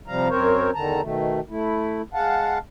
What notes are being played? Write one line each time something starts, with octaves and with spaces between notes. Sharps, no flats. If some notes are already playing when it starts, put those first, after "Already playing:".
C3 F3 G3 F5 A#5
F#2 C4 A#4 C5 C#5
E2 D3 D#3 A5 A#5
B2 D#3 A3
A3 E4
G#3 F5 F#5 A5